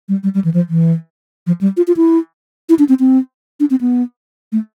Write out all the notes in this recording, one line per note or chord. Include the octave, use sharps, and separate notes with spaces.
G3
G3
G3
E3
F3
E3
F3
G3
F4
F4
E4
E4
D4
C4
C4
D4
C4
B3
A3